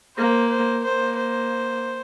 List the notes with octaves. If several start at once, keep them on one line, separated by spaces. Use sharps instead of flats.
A#3 C5
C5
A#3 C5
C5